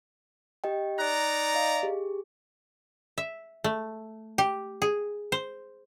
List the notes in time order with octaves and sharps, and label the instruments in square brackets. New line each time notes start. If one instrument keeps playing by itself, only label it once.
[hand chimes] G4 D#5 G5
[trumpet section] D#4 D5 A#5 [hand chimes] F#6
[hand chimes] D#5 F5
G4 G#4
[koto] E5
A3
G4
G#4
C5